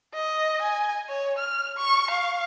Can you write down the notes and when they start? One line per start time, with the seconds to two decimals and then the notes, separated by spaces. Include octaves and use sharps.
0.14 D#5
0.61 G#5
1.08 C#5
1.38 F6
1.77 C#6
2.11 F5